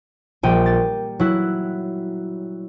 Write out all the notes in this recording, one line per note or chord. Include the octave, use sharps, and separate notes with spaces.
A#1 G3 G5 D#7
A6
F#3 E4 F#6